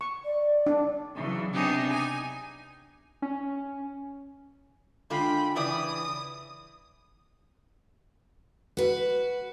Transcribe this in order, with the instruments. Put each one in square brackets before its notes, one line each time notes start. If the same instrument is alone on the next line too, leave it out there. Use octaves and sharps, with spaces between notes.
[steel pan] C#6
[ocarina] D5
[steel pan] D4
[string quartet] C#3 E3 F#3
C3 B3 D4 D#4 G4 G#4
D#4 G#5
[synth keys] C#4
[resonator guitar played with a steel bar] D3 G#3 F4 [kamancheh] G5 B5
[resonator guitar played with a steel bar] C#3 E3 D5 [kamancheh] D#6
[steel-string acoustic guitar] F#4 B4